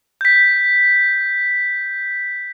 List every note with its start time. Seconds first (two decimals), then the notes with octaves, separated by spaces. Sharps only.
0.21 G6 B6